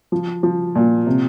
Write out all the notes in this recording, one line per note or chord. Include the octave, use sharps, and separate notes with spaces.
F3
F3
A#2
C3